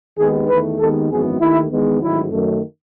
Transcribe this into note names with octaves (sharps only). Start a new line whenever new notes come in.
D#2 D#3 G#3 B3 G#4
E2 D#3 A3 B4
D#2 D#3 G#3 B3 A4
G#1 F#2 E3 G#3 B3 G#4
D#2 D#3 A3 E4
E2 D#3 G#3 B3
A1 G#2 D#3 F#3 E4
F#2 D#3 A3